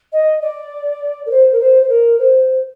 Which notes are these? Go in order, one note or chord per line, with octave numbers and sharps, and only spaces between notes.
D#5
D5
A#4
C5
A#4
C5
C5
A#4
C5